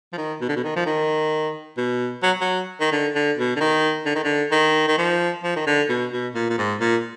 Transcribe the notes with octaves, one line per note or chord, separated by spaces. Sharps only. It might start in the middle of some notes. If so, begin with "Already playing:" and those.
F3
D#3
B2
D3
B2
D#3
F3
D#3
B2
F#3
F#3
D#3
D3
D3
B2
D3
D#3
D3
D#3
D3
D#3
D#3
F3
F3
D#3
D3
B2
B2
A#2
A#2
G#2
A#2